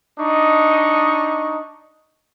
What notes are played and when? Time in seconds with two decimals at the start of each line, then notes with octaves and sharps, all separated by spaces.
0.19 D4 D#4 D#5 C#6